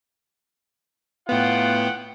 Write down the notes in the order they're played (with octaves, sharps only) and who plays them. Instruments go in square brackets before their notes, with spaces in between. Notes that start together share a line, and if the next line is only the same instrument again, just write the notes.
[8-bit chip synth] A2 B3 [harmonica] F4 F#5 G5